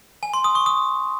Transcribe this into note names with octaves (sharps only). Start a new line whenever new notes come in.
G#5
C6
D#6
C#6
D#6